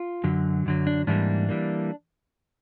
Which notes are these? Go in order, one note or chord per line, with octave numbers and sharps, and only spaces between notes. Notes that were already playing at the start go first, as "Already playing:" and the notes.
Already playing: F4
F#2 D3 F#3
F#2 D3 F#3
D4
G#2 E3 G3 A#3 D4
E3 G3 A#3